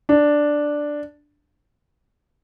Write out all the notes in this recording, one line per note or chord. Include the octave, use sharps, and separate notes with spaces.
D4